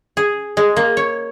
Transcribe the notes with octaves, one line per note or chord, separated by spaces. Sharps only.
G#4
G#3
A#3
C#5